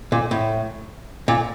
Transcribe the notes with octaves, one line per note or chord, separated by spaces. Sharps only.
A#2
A2
A#2